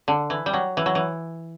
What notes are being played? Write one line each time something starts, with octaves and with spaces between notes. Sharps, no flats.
D3
E3
G3
F#3
E3
F#3
E3